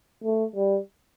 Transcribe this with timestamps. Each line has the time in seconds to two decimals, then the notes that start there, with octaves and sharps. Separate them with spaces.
0.24 A3
0.56 G3